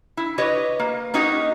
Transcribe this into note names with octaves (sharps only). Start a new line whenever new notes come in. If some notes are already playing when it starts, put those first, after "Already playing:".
E4
F#4 G4 B4 C#5 D#5
A#3
A#3 C#4 D#4 F#4 G4 D#5